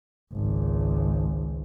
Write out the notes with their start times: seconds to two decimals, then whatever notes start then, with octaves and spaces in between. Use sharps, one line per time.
0.33 G#1 C#2